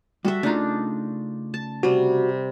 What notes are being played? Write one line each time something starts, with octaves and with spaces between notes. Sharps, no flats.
G3 F#4 A4 E5
C#3 A3 D4 D#4 F4 A#5
A5
C3 G3 F#4